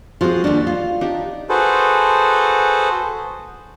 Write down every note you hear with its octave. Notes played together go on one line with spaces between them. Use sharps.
F3 C4 F4 F#4 G#4
D#2 D4 D#5 F#5 B5
F4
D4 D#4 G4
F#4 G#4 A4 B4 C5